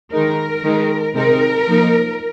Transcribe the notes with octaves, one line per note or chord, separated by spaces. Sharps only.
D#3 G#3 D#4 A#4
D#3 G#3 D#4
C3 G#3 C4 D#4 A#4
F3 A#3 D#4